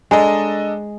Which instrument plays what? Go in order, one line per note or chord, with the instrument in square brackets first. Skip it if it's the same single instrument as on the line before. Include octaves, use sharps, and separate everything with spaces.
[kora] G#3 [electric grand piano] D4 A4 D#5 [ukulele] G#5 A#5